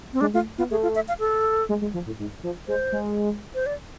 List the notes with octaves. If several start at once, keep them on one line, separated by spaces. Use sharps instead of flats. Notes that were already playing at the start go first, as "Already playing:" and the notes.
C4
G#3 D4
A3 F4
B3 F4
A3 G#4
F4
E5
F5
A4
G#3
G#3
F3
A2
G#2
F3
G#3 C5
G#3
C5
D5